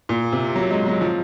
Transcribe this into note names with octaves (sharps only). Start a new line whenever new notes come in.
A#2
C3
F#3
G#3
F#3
F3